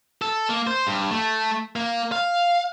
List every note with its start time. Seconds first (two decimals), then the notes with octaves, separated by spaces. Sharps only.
0.22 A4
0.49 A#3
0.67 C5
0.87 G2
1.11 A3
1.76 A#3
2.12 F5